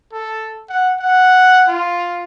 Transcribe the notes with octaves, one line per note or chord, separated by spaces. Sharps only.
A4
F#5
F#5
F4